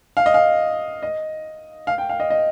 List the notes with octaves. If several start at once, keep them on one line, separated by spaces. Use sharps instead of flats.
F5
D#5
F5
D#5
F5
G5
F5
D#5
D#5